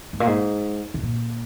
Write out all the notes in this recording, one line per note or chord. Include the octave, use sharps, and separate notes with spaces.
G#2
A#2
G#2
C3
A#2